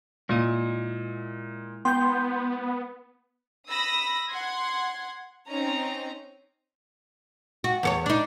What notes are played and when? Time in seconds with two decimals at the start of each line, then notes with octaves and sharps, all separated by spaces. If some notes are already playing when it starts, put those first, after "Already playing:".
0.29 A#2 G#3 E4 D#5
1.85 B3 G5 C6 G6
3.70 B5 D#6 E6 A#6
4.30 F#5 C6 G#6
5.49 C4 C#4 D#4 A#5
7.64 F#4
7.83 E2 A4 C#5
8.06 D4 D#4